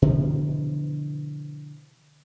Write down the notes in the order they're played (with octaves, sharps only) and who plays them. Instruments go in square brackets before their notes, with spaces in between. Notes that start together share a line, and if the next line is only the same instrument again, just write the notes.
[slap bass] B2 D3 E3 F3